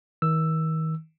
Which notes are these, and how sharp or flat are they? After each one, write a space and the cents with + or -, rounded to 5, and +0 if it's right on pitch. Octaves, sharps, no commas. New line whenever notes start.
D#3 +35 E6 +5